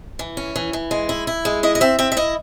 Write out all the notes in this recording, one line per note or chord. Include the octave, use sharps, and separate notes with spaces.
E3
C#4
E3
E3
G#3
E4
E4
G#3
E4 D#5
D#5
C4 E5
C4 E5
E5
E4 D#5